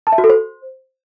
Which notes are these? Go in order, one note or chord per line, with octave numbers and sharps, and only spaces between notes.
A5
E5
F#4
A4
C5